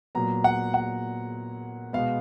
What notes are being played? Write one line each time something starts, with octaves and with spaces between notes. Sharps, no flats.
A#2 F#3 B3 A#5
F#5
F#5
B2 G#3 B3 F5